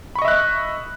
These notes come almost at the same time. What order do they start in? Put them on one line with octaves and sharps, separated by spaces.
B5 C#6 D#5 E5 F#6